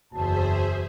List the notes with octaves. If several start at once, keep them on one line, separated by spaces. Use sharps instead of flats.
F#1 E2 F#4 G#4 C5 E5 A5